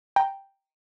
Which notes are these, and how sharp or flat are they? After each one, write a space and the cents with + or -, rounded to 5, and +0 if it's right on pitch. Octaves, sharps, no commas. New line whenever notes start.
G5 +0 A#5 +0